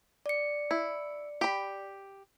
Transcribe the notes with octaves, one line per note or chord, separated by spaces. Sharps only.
D5 C#7
E4
G4 B5